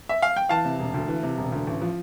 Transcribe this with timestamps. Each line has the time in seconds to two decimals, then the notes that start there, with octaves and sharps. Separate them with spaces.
0.09 E5
0.22 F5
0.36 G5
0.49 E3 F5 A5
0.64 C3
0.79 E1
0.94 D2
1.08 E3
1.23 C3
1.38 E1
1.52 D2
1.67 A1
1.81 F3